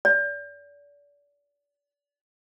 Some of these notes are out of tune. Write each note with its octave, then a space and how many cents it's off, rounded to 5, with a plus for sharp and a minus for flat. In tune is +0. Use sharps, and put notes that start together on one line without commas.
D5 -35